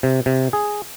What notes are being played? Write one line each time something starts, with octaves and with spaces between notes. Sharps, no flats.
C3
C3
G#4